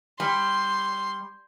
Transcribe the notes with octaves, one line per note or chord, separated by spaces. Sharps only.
G3 C6